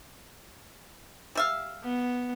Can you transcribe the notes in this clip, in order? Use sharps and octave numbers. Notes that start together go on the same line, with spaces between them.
G3 E5 F5
B3